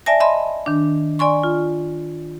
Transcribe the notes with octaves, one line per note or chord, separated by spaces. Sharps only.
D5 E5 G#5 A5 A#6
D#5 E5 A5 B5 C6
D#3 D4
D5 G#5 C6 C#6
F4